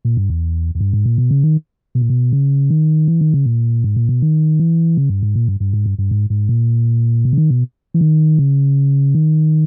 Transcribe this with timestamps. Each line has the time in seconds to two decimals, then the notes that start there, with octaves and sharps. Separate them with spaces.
0.05 A#2
0.17 G2
0.30 E2
0.75 E2
0.81 G2
0.93 G#2
1.06 A#2
1.18 B2
1.31 C#3
1.44 D#3
1.95 B2
2.01 A#2
2.10 B2
2.33 C#3
2.70 D#3
3.08 E3
3.21 D#3
3.34 C#3
3.46 A#2
3.84 G#2
3.96 A#2
4.09 B2
4.22 D#3
4.59 E3
4.97 C#3
5.10 G2
5.23 G#2
5.35 A#2
5.48 G2
5.60 G2
5.73 G#2
5.86 G2
5.98 G2
6.11 G#2
6.30 G#2
6.49 A#2
7.25 B2
7.33 C#3
7.38 D#3
7.50 B2
7.94 E3
8.01 D#3
8.39 C#3
9.15 D#3